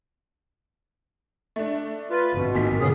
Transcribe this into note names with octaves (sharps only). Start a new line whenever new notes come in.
A3 D4
F4 B4
A1 G#2 B2
A#2 D#3 B6
B2 D3 B3 C#4 G#4